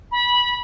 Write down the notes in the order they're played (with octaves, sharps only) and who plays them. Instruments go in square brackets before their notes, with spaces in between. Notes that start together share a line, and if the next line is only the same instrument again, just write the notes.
[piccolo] B5